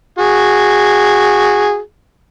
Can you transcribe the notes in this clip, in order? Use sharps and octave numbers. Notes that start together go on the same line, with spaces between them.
F#4 G#4